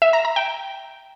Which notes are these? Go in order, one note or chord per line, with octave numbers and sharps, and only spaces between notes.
E5
A#5
A#5
G5